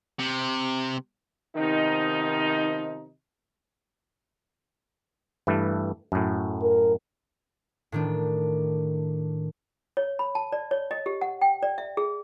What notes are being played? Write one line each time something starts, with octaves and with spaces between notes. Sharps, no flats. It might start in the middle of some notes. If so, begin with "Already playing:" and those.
C3
C3 D#3 F3 B3 D#4
G2 E3 A3
F#2 A2
A#4
A2 D#3 D4
C#5
B5
A5
D5
C#5
D#5
G4
F#5
G5
D5
E5
G#4